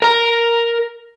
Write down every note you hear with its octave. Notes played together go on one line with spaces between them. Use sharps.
A#4 A#5